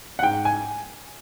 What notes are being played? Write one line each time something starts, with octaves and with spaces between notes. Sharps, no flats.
F#5
G#2 G5
G#5